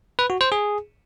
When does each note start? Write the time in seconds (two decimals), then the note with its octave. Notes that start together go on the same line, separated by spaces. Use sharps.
0.19 B4
0.30 F#4
0.41 C5
0.52 G#4